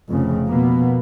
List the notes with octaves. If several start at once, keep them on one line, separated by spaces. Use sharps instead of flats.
F1 F2 C#3
B2 A#3 B3